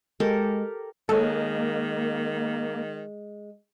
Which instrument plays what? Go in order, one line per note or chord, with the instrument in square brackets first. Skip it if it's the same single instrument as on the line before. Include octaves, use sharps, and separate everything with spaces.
[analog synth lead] G#3 [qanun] G4 A4 A#4
[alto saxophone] D#3 [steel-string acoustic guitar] G#3 [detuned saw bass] A#3 [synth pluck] A4 C#5